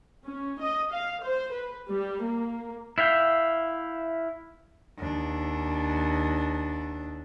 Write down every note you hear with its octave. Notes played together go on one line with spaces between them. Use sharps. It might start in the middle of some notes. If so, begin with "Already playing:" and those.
C#4
D#5
F5
C5
B4
G3
A#3
E4 E5 F5 G5
D#2 D4